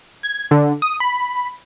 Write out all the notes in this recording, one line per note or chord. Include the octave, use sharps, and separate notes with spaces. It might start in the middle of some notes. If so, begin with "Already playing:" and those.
G#6
D3
D#6
B5